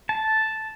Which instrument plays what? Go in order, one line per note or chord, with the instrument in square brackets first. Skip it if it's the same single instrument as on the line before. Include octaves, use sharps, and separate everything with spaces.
[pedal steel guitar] A5